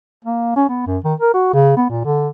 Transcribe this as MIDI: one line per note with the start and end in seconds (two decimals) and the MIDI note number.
0.25 0.53 58
0.56 0.65 61
0.69 0.86 59
0.87 0.98 42
1.05 1.14 51
1.20 1.34 70
1.34 1.53 66
1.54 1.76 49
1.77 1.85 59
1.90 2.04 46
2.05 2.28 50